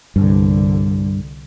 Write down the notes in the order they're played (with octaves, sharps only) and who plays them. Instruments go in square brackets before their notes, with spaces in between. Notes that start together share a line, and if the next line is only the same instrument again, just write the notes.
[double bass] C2 D3 [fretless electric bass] G2